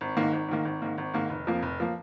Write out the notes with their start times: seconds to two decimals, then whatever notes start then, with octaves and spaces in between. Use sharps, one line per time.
0.01 G#1
0.17 G#2 D#3 A#3
0.33 G#1
0.49 G#2 D#3 A#3
0.65 G#1
0.82 G#2 D#3 A#3
0.98 G#1
1.14 G#2 D#3 A#3
1.30 F1
1.47 F2 F3 A#3
1.63 F1
1.80 F3 A#3